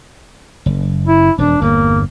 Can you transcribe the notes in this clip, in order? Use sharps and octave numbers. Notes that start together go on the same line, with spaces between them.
F#1
E4
E1 F2 D4
G1 E2 G2 A#3